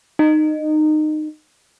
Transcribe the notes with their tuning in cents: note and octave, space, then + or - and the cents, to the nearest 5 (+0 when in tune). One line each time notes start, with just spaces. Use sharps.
D#4 -20